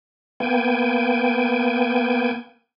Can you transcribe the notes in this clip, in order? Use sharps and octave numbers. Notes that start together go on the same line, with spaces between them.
A#3 B3 G5 G#5